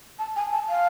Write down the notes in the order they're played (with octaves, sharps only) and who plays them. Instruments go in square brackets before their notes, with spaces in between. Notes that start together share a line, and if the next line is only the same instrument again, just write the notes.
[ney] A5
G#5
A5
F5